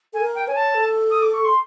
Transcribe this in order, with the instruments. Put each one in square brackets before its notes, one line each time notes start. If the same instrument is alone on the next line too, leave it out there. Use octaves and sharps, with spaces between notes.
[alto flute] A4 [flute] G#5
[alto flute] A#4
[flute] G5
[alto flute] C#5 [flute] G#5
[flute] A5
[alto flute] A4
[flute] D#6
D6
C#6
C6